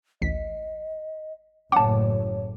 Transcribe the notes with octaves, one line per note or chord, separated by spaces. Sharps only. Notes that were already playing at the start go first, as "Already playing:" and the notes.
A1 D2 D#5 B6
F#1 A2 C#5 F#5 A5 D6